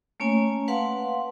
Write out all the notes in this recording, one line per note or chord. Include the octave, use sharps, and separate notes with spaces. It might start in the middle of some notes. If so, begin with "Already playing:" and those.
A3 A#3 C#4 C#5 G#5
B4 F5 F#5 A5 C6